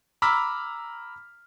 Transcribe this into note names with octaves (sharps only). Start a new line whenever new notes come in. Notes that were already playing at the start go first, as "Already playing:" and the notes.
A#5 B5 D6 E6 F6 B6